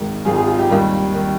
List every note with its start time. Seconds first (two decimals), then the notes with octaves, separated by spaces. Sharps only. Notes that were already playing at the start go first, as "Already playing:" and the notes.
Already playing: G#1 G#2 D#3
0.25 G#1 G#2 D#3 F4 G#4
0.36 F4 G#4
0.47 F4 G#4
0.58 D#4 G4
0.69 D#2 D#3 G3 A#3
1.13 D#3